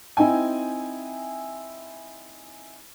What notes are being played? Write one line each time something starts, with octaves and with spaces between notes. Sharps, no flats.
C4 D#4 E4 G5 G#5